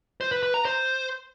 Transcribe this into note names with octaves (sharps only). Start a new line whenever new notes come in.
C5
B4
B4
A#5
C5